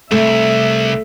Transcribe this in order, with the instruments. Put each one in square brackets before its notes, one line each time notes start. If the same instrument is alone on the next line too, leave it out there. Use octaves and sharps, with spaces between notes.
[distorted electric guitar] C2 [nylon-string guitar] A3 [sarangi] E5